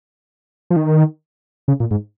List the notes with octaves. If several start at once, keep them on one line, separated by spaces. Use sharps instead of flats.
F3
D#3
C#3
A#2
G#2